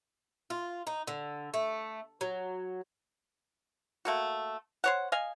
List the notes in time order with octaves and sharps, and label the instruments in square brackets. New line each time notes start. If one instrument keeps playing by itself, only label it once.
[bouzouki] F4
D#4
D3
A3
F#3
[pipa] A3 A#3 F#4
C5 C#5 F#5
D#5 F5 G#5